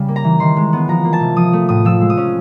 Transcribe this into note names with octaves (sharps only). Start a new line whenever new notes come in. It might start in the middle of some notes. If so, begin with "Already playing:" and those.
Already playing: C#3 G3
A#3
A#5
E3
D#3 C6
G#3
B3
F3 A#5
A#3
A5
C3
F3 D#6
A3
A2 D#6
F3 E6
G#3
D#6
C#4